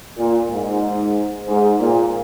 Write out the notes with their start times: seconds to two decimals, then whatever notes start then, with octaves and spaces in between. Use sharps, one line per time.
0.18 A#2
0.51 G#2
1.48 G#2
1.80 A#2